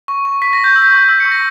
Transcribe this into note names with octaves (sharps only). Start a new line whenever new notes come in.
C#6
C#6
C#6 B6
A#6
C#6
G6
E6
G6
C#6
E6 B6
C#7
C#6
A#6